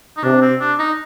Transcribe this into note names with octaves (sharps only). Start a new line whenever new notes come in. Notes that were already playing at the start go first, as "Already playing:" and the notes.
D#4
C3 D4
C4
D4
D#4